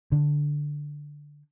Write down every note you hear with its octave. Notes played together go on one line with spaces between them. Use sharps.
D3